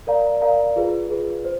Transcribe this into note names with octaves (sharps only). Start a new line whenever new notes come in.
A#4 D5 F5 A#5
A#4 D5 F5 A#5
F4 G#4 B4
F4 G#4 B4
C5